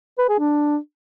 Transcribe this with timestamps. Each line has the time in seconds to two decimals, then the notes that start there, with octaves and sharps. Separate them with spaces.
0.18 B4
0.29 G#4
0.39 D4